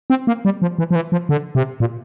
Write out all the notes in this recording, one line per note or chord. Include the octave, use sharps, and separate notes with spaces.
C4
A#3
G3
F3
E3
F3
E3
F3
D3
C3
A#2